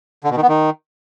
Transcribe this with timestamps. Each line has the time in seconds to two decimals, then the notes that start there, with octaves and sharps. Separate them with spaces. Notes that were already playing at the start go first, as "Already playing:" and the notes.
0.24 D3
0.30 B2
0.37 D#3
0.43 B3
0.49 D#3